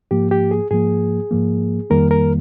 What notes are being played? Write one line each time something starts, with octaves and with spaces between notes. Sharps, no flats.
G#2 F3 A#3 G4
G4
G#4
G#2 F3 A#3 G#4
G#2 F3 A#3
F2 D#3 G3 A#3 A#4
A#4